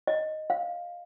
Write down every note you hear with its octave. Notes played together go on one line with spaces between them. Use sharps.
D#5
F5